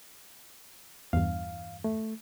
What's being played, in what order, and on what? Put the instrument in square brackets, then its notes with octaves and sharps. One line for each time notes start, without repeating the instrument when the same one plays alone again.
[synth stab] E2 G2 [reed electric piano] F5
[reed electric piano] A3